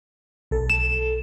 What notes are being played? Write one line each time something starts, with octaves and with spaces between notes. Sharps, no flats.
B1 A4
E7